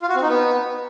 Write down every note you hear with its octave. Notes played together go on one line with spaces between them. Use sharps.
F4
F#4
C4
D#4
B3